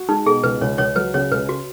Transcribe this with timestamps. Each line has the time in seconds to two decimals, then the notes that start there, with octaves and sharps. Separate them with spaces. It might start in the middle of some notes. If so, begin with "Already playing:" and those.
Already playing: F#4
0.08 G#3 D#4
0.26 B2 G#4
0.44 C#2 B4
0.61 C#2 C#5
0.78 C#2 C#5
0.96 F#3 B4
1.14 C#3 C#5
1.31 C#2 B4
1.49 F#4